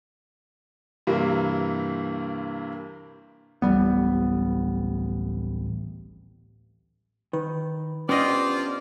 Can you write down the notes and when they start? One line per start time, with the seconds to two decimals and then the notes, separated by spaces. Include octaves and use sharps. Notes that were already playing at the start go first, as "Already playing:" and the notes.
1.07 G2 C3 E3 A#3
3.62 D1 A1 G3 B3
7.33 D#3 B4
8.09 B3 C#4 D4 F4 G4 C5 D5 D#5